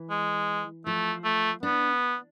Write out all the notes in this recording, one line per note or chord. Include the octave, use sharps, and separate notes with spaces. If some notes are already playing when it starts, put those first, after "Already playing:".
Already playing: E3
G#3
F3 A3
A3
B3 D4